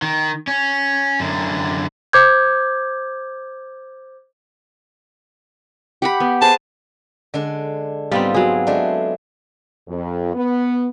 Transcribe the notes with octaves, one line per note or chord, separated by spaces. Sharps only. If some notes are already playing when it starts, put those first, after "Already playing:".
D#3
C#4
F#2 D3
C5 D6 G6 G#6
G4 F#5 B5
B3
G#4 B4 C5 A5
D3 G#3 D4
G#2 G3 B3 C4 F4
F#3 G#4
G#3 A3 D4
F2
B3